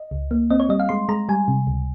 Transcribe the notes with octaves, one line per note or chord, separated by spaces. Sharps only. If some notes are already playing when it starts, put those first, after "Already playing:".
Already playing: D#5
C#2
A#3
C4 D#5
C#5
G3 D#5
F5
G#3 C6
G#3 A#5
G3 G#5
C3
C#2